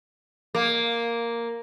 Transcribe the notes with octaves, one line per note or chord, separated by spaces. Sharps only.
A#3